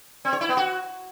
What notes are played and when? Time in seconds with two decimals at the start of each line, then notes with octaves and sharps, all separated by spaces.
0.25 C4
0.33 C#5
0.41 E4
0.49 B3
0.57 F#4